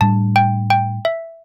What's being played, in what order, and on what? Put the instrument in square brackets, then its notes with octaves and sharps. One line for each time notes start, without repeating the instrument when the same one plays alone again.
[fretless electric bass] A2 G3 D4 [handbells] A5
[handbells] G5
G5
E5